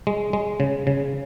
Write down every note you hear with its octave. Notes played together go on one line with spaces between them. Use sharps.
G#3
G#3
C#3
C#3